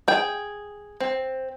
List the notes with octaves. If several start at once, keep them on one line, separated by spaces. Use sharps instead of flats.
G#4 G5
C4